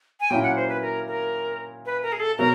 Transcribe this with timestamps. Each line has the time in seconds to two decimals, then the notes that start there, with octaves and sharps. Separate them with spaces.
0.20 G#5
0.30 A#2 F#3 A#3 C#4 E4 G5
0.44 F#5
0.56 C5
0.69 B4
0.82 A#4
1.08 A#4
1.86 B4
2.03 A#4
2.12 G#4
2.20 A4
2.38 B2 F#3 A#4